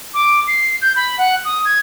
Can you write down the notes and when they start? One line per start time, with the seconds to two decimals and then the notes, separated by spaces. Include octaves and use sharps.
0.14 D6
0.47 C7
0.82 G6
0.96 B5
1.18 F#5
1.45 D#6
1.65 G#6